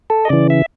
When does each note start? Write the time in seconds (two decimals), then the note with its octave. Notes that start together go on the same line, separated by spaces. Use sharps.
0.10 A4
0.25 D#5
0.29 C#3 E3 D5
0.50 E5